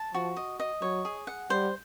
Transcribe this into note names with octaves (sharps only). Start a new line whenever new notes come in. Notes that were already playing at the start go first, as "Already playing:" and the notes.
Already playing: A5
F3 F#4
D#5
D#5
F#3 C#5
G#4
F#5
G3 C5